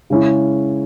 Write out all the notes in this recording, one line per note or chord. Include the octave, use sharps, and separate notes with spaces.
C#3 G#3 C#4 E4